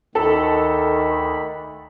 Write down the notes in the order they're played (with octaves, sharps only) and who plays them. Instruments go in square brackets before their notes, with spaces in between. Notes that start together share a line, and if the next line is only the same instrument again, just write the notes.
[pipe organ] D2 B5 [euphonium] D#3 [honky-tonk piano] A4